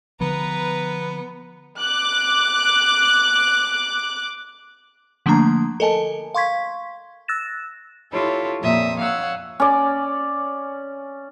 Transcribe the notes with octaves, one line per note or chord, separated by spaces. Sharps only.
D3 F3 B3 B4 A#5
D6 F#6
D3 F3 A3 A#3 D4 A#5
A4 A#4 D#5 G#5 A5
F5 C6 C#6 G#6 B6
E6 F#6 A6 A#6 E7
E4 F4 G4 A4 C#5
F2 A#2 A#3 E5 D#6
C#5 F5 F#5 E6
C#4 D5